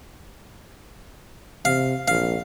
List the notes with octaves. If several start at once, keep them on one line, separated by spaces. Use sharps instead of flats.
C3 F5
A#1 F5